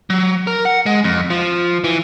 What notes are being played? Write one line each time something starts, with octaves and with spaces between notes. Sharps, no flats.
F#3
A#4
F#5
G#3
F2
F3
E3